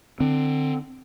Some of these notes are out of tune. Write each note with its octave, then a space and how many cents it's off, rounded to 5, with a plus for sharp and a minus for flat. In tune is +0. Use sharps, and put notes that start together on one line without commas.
D3 +25 C4 +0